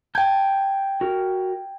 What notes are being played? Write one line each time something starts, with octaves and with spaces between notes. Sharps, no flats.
G5 A5 G6 G#6
F#4 A#4